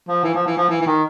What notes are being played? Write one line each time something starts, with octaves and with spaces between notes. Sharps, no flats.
F3
E3
F3
E3
F3
E3
E3
D#3